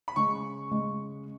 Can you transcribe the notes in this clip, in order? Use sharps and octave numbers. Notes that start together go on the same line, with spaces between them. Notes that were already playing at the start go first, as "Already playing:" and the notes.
B5
C#3 G#3 C#4 C#6
C#3 G#3 C#4